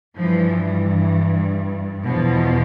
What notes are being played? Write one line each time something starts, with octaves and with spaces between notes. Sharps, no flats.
G2 E3 F3
E3
E2 B2 F3